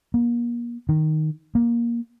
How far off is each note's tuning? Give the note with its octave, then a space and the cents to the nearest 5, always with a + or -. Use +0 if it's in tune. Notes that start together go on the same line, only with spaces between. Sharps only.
A#3 +35
D#3 -5
A#3 +15